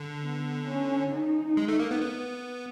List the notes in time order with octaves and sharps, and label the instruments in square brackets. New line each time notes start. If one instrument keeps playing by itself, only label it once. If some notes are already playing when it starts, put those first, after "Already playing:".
Already playing: [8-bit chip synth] D3
[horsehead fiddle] B3
C#4
D#4
[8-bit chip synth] G#3
A3
A#3
B3
B3